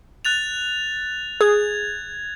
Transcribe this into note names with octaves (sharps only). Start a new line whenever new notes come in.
F#6 A6 F7
G#4 G#6